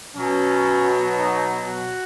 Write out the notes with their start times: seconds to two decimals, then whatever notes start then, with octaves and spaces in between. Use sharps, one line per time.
0.15 B2 F#3 C#4
1.15 D#4
1.65 F#4